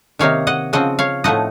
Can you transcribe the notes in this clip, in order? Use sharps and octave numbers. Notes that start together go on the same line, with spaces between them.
C3 D#3 A#3 D#4 C#5 F5
D#5 F#5
C#3 F3 C4 D#5 F#5
C#5 F5
A2 F3 A3 D#4 D#5 F#5